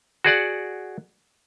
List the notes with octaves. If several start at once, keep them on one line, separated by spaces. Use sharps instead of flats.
F#4 G#4 D5 F#5